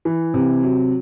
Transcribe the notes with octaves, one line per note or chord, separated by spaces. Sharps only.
E3
C3
F#3